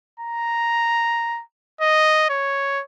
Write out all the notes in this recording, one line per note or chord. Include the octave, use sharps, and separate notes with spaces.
A#5
D#5
C#5